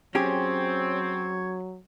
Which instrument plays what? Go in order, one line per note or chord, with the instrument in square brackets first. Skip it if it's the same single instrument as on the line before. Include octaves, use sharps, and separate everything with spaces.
[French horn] F#3 [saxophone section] C4 [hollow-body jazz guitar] C#4 G4 G#4 [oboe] C#5